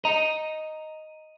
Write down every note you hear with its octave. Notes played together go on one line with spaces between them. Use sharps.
D#5 A#5